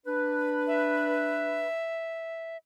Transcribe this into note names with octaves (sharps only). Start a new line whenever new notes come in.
D4 B4
E5